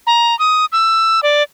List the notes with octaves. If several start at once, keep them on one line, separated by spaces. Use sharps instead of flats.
A#5
D#6
E6
D5